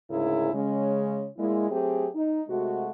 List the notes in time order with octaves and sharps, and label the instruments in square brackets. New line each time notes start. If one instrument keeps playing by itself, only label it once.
[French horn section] D2 G#2 C#3 E4 G#4 A#4
C#3 G#3 C#4
A#2 G#3 E4
F#3 A3 C4 G4 G#4
D#4
C3 G#3 A3 F#4